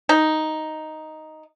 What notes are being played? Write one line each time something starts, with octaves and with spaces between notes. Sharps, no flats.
D#4